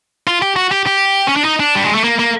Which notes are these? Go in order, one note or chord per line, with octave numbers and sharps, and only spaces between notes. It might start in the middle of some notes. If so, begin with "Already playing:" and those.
F4
G4
F#4
G4
G4
C#4
D4
D#4
D4
G3
G#3
A3
A#3
A#3